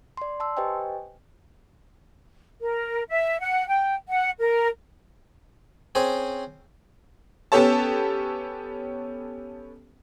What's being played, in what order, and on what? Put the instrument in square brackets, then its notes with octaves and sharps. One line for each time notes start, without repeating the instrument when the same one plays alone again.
[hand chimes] D5 C6
A5 C6 E6
G4 B4 C5 D#5 G5 G#5
[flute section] A#4
E5
F#5
G5
F#5
A#4
[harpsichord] C4 C#4 G#4 C5
[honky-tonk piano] B3 C#4 G4 A4 C#5 A5